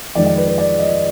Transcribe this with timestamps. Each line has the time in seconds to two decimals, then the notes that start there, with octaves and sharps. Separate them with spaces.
0.15 F2 D#3 G#3 D5
0.27 D5
0.37 B4
0.48 B4
0.58 D5
0.79 D#5